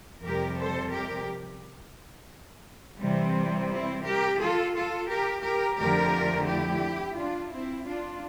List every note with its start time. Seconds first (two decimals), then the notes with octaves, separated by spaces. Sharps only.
0.24 F2 C3 G3 G4 A#4
0.58 A4 C5
0.93 G4 A#4
3.01 C3 E3 G3 C4
3.70 C4 E4
4.04 G4 A#4
4.40 F4 A4
4.74 F4 A4
5.09 G4 A#4
5.43 G4 A#4
5.78 F2 D3 F3 A3 G4 A#4
6.47 E4 G4
7.16 D4 F4
7.51 C4 E4
7.85 D4 F4